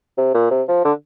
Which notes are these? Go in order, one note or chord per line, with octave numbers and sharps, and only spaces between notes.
C3
A#2
C3
F3
D3